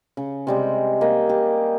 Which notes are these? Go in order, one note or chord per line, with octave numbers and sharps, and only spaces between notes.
C#3
C3 G3 G#3
A#3 D#5
G4